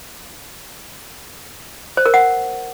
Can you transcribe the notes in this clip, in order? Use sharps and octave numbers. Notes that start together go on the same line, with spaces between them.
C5
A#4
F#5